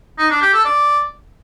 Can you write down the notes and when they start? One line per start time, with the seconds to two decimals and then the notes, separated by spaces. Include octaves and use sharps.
0.19 D#4
0.30 D4
0.42 G4
0.53 A4
0.65 D5